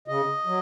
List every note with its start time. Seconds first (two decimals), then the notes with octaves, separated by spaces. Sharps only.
0.08 C#3 D#5
0.46 F#3